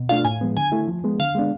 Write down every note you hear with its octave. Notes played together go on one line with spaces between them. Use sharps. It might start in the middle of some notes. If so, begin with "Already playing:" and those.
Already playing: B2
A3 D4 F4 F5
A2 G#5
F3 G#3 B3
D3 G#5
A3 E4
F3
G#3 B3
D3 F5
G#3 B3 D4